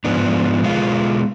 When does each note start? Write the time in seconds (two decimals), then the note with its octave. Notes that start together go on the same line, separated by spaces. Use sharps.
0.05 G#2 F3 B3 D4
0.63 B2 G#3 B3 F4